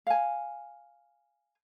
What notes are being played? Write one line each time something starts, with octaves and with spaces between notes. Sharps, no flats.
F5 G#5